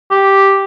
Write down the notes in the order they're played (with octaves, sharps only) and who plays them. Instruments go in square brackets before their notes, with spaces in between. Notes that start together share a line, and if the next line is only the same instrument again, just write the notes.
[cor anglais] G4